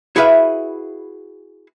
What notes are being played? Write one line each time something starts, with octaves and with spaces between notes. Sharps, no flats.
E4 F#4 G#4 B4 E5 F5